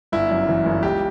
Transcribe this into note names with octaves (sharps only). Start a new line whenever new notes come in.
G1 E4
F#2
E3
G1
C#2 G4